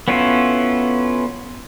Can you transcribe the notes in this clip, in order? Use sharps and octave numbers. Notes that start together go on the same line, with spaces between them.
B3 C#4 E4 F4 A4